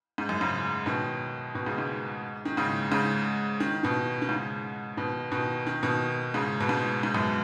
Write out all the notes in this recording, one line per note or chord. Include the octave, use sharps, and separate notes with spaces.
G#2
F#2
G#2 C#3
B2 D#3
B2 D#3
G#2 C#3
G#2
D#3
G#2 C#3
G#2 C#3
D#3
B2 D#3
D#3
G#2 C#3
B2 D#3
B2 D#3
D#3
B2 D#3
G#2 C#3
B2
G#2
G#2
F#2 B2